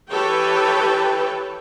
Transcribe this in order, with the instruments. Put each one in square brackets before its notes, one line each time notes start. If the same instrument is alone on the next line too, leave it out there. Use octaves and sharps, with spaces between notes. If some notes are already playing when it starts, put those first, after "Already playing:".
[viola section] E3 G4 A4 B4 C#5 G5